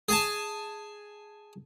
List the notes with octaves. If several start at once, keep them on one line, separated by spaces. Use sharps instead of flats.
G#4 G#5 A5